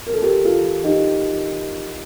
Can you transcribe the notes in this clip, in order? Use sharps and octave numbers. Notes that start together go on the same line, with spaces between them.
A#4
A4
G4 A#4
F4 A4
D#4 G4